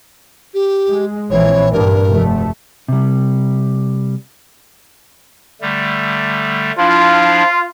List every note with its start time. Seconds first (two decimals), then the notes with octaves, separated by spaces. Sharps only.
0.54 G4
0.88 G#3
1.31 A#1 E3 C4 C#5
1.73 G2 A#4
2.07 F1 A3
2.88 C3 G3
5.61 D3 G3 A3
6.78 F3 D4 E4 F4